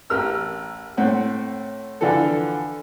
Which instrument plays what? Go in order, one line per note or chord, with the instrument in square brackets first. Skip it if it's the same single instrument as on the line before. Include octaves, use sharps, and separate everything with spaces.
[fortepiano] A1 G4 A#4 E6 F6
A2 C4 F#5
D3 E3 F3 D4 A4